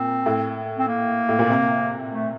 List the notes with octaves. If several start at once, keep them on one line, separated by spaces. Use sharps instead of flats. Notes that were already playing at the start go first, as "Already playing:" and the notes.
Already playing: A#2 C4
A2
C4
A#3
A2
A#2
C3
A3